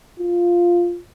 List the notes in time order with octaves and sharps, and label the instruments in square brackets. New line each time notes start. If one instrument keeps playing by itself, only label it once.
[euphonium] F4